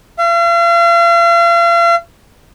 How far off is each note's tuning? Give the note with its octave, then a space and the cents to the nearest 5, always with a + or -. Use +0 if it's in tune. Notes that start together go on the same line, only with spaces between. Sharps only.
F5 -40